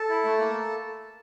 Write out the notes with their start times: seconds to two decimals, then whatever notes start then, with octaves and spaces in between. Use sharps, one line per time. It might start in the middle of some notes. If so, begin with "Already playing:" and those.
Already playing: A4
0.10 E4
0.25 A3
0.39 A#3